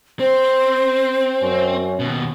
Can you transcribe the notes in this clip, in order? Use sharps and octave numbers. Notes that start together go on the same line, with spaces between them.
C4 C5
F#2 C#4
D#2 B2